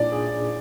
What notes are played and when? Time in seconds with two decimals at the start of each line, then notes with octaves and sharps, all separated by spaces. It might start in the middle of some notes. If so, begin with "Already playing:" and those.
Already playing: A#2 D4 D5
0.12 G#4